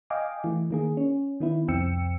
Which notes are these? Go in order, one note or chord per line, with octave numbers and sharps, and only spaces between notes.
D#5 F5 G5 G#5 D6
E3 A3
D#3 A#3 G#4
C#4
D#3 B3 E4
C2 F2 C4 G5 E6 C#7